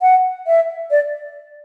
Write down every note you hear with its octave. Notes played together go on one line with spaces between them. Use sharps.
F#5
E5
D5